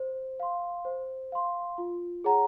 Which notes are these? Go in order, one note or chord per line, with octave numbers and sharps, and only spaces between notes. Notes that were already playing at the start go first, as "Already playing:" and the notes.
Already playing: C5
F5 C6
C5
F5 C6
F4
G#4 C#5 F#5 A#5